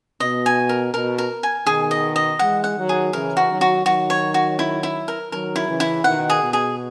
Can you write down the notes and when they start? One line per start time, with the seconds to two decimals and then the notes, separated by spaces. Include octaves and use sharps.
0.20 B2 D#5
0.46 G#5
0.69 A#4
0.94 B2 A#4
1.18 A#4
1.43 G#5
1.66 B2 D#3 G#4
1.91 D#5
2.16 D#5
2.39 E3 G#3 F#5
2.64 F#5
2.76 D#3 F#3
2.89 G#4
3.13 C#3 E3 A#4
3.37 F#4
3.49 D#3 F#3
3.61 F#4
3.85 D#3 F#3 F#4
4.10 C#5
4.34 F#4
4.59 E4
4.83 E4
5.08 A#4
5.32 D#3 F#3 A#4
5.56 E4
5.68 C#3 E3
5.80 E4
6.04 B2 D#3 F#5
6.30 G#4
6.42 B2
6.53 G#4